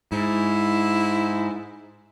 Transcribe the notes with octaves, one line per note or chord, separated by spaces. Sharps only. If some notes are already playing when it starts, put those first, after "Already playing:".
G#2 E4